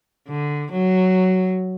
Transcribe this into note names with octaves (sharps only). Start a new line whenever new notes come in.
D3
F#3